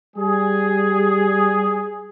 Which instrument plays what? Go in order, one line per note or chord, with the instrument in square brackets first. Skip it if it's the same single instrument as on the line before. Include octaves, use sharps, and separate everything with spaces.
[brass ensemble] G3 G#4